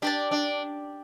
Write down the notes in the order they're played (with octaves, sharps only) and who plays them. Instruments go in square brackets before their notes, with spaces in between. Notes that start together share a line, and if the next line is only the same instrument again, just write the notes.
[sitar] D4 [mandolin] G4 D5 A5
[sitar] D4